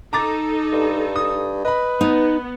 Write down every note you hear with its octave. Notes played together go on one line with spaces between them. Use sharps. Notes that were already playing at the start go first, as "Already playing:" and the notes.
D#4 A4 A#5 D6 A6
G2
D#6
B4 D#5 B5
B3 D#4